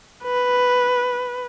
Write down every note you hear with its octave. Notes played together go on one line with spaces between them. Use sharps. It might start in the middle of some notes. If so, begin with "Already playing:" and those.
B4